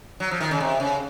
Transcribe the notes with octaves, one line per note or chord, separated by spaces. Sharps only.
F#3
F3
D#3
C#3
C3
C#3